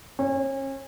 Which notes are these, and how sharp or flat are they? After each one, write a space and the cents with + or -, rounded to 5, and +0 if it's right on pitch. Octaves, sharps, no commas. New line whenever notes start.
C#4 -35